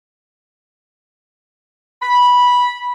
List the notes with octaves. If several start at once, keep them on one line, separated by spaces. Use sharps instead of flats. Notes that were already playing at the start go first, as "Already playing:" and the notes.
B5